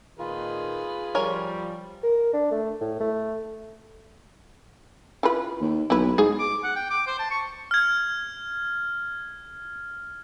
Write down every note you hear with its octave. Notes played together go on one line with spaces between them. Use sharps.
A#2 D#3 F4 G#4 B4
F3 G3 A#4 C#5 G#5
A#4
D4
A3
A2
A3
E4 F4 B4
D#2
B1 E4 B4
G#2 G#4
D6
F#5
G5
D6
C5
A5
C#6
F6 G#6